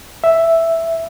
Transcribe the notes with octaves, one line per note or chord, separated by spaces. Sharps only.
E5